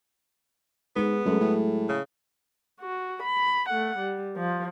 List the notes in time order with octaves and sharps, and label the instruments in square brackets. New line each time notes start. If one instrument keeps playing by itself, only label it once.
[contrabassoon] G#2 [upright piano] G#3 [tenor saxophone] B3
[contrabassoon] F#2 [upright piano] F#3 G#3 A3
[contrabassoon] A2
[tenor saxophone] C#3
[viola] F#4
B5
A3 F#5
G3
F3